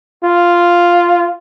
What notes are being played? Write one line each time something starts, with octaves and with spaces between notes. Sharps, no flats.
F4